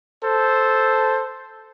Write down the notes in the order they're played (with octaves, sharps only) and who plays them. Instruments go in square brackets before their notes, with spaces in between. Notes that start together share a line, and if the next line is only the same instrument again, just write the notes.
[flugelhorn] A4 [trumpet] C5